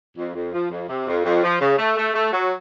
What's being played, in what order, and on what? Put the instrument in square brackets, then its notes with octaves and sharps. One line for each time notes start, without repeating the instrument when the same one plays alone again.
[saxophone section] F2
F2
F3
F2
C3
F2
F2
F3
C#3
A3
A3
A3
F#3